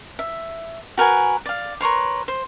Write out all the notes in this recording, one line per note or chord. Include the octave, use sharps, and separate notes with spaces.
E5
F#4 A#4 B4 G#5
D5 F5
A#4 B4 C#5 C6
C5